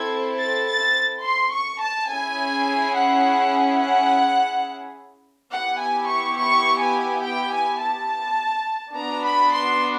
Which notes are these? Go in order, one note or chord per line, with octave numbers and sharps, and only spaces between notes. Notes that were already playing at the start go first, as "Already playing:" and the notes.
Already playing: C4 E4 A4 G#6
A6
A6
C6
C#6
A5
C#4 E4 G#4 G#5
F#5
F#5
B3 E4 G4 F#5
G#5
C#6
C#6
G#5
G5
G#5
A5
B3 D4 F#4 A#5
B5
C6